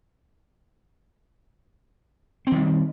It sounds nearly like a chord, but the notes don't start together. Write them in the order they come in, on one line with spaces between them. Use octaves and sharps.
C4 D#3 G3